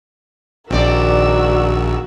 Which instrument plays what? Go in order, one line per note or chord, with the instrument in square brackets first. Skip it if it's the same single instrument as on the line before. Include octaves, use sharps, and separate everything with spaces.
[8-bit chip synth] A#1 [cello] D#3 F#4 [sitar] C4 D5 [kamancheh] A#4 E6